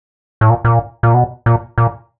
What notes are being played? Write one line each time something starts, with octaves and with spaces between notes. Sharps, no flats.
A2
A#2
A#2
A#2
B2
A#2
A#2